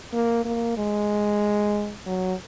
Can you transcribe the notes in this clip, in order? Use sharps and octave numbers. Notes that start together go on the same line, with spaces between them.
A#3
A#3
G#3
F#3